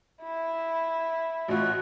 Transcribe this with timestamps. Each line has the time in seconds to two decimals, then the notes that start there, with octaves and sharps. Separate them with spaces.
0.22 E4
1.48 A1 F4 F#4